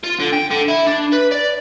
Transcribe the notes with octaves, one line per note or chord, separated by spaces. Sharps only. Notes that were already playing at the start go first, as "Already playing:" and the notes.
F4
D3
G5
D3
E4
D4
B4
D5